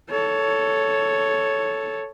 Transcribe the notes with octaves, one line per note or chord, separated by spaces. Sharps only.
A4 C#5